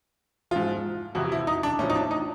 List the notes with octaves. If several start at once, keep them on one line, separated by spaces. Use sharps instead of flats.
G#2 F3 F4
F2 C3 E3 F#4
E4
D#4
D4
A2 F3 C#4
D#4
D4
D#4